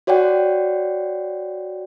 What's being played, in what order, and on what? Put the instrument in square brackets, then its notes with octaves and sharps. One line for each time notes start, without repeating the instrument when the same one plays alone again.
[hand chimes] F#4 C#5 D5 F#5 G5